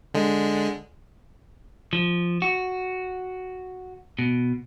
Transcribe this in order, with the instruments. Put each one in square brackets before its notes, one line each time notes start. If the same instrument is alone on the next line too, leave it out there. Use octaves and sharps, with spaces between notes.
[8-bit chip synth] D3 G#3
[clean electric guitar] F3
F#4
B2